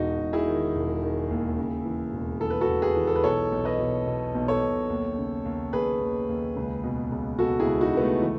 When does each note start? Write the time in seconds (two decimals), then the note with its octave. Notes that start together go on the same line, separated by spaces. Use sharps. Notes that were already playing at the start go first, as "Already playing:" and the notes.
Already playing: E1 D#4 F#4
0.19 E1
0.33 E4 G#4
0.47 D#3
0.75 E1
1.02 D#3
1.30 D#2
1.58 C#3
1.85 E3
2.13 E1
2.40 E3 A4
2.50 B4
2.61 F#4 A4
2.68 E1
2.82 G#4 B4
2.96 E3
3.07 A4
3.16 B4
3.24 B1 A4 C#5
3.52 B1
3.65 B4 D#5
3.79 B2
4.06 B2
4.35 B1
4.48 A4 C#5
4.62 B1
4.90 D#2
5.17 C#3
5.45 D#2
5.73 D#2 G#4 B4
6.00 D#2
6.29 D#2
6.56 C#2
6.84 B2
7.11 C#2
7.39 B2 F#4 A4
7.59 E4 G#4
7.66 C#2
7.80 D#4 F#4
7.94 C#2 B3
8.01 A3
8.22 E3